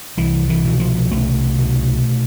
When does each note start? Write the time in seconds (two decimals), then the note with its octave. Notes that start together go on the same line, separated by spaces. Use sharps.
0.17 C2 E3
0.49 E3
0.65 B2
0.80 F3
1.11 C2 A3
1.59 B2